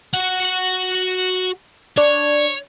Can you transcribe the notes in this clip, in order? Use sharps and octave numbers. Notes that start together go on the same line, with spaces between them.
F#4 F#5
D4 C#5